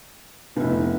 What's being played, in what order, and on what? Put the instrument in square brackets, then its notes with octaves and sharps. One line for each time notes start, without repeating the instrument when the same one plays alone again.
[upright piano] F1 E4 [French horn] B3